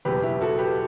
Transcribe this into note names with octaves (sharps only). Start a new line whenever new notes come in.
F#1 E2 B2 F#3 G4 B4
E4 G4
F#4 A4
G4 B4